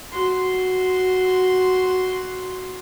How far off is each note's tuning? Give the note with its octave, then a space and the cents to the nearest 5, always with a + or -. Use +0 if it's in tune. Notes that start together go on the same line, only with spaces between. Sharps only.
F#4 +0 C6 +0